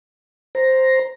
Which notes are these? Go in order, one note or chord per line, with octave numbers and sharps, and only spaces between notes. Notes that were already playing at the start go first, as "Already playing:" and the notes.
C5 A#5